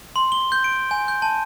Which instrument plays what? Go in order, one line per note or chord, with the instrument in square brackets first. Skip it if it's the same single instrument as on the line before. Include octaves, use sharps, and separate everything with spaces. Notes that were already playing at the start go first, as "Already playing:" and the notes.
[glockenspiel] C6
G7
G6
D7
G#5
G6
A5